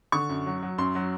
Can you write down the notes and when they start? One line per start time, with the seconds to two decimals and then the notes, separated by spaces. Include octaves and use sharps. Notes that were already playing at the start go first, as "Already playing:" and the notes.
0.12 D3 C#6
0.29 F#2
0.46 F#3
0.63 F#3
0.78 F#2 C6
0.95 F#3